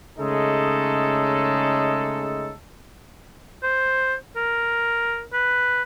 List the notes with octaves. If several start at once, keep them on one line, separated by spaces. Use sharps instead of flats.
C#3 G#3 A3 C#4 D#4 A4
C5
A#4
B4